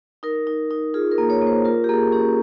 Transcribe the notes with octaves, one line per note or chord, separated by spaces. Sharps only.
D#4 A#4
D#4
D#4
F4 G#4
A#4
A#3
C#5
A#3
C5
F4 A#4
G4
A#3 G#4
C#4 G4